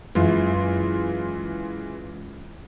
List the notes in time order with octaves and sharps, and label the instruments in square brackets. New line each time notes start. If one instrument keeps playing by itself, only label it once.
[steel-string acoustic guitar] F#2 [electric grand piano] E3 G#3 F4